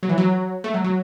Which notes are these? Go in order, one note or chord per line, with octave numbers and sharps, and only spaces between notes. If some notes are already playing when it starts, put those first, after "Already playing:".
F#3
E3
F#3
A3
F#3
F#3